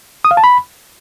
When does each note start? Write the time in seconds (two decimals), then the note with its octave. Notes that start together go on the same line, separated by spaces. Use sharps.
0.25 D#6
0.31 F5
0.37 A5
0.44 B5